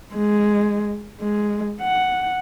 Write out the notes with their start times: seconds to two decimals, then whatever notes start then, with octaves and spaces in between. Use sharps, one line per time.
0.15 G#3
1.21 G#3
1.81 F#5